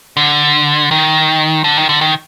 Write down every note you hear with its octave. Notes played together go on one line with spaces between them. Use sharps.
D3
D#3
D3
D#3
D3
D#3